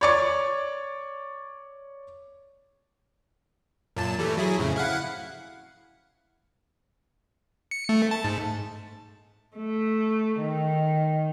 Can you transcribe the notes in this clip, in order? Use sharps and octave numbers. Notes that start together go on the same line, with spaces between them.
C#5 D5 C#6
F#2 A#2 A5
E3 G3 A3
F#3 E4 G#4
F2 A2 C#3
E4 F5 F#5
C#7
A3
A5
G#2
A3
D#3